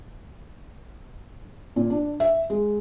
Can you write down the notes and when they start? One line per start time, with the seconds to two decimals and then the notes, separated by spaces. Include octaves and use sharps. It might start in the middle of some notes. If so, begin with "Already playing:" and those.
1.76 A#2
1.90 D4
2.20 E5
2.50 G#3